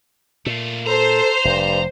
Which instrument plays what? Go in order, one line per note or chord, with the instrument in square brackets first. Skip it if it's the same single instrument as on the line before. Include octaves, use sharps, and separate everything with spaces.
[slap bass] A#2 [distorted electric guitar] A3 F4
[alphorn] A4 [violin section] C5 [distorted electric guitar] A#5
[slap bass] F1 [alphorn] G2